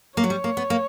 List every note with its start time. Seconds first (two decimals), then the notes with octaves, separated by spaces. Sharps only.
0.17 A#3 C#5
0.24 F#3
0.30 G3
0.44 A#3
0.57 B3
0.70 A#3